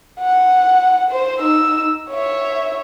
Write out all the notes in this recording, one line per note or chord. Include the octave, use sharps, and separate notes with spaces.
F#5
C5
D#4 E6
C#5 E5